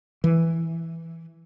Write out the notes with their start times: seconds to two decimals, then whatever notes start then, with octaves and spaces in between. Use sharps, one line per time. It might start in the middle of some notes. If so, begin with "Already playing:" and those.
0.24 E3